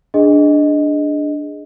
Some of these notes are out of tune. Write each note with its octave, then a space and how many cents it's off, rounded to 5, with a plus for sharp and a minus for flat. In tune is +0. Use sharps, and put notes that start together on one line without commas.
D4 +0 G#4 +0 D#5 +0